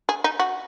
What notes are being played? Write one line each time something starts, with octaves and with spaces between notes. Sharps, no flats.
G#4
D#4
F#4